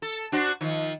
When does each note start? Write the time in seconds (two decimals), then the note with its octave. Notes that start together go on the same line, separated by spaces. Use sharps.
0.02 A4
0.32 D4 F#4 C5
0.61 D#3 F3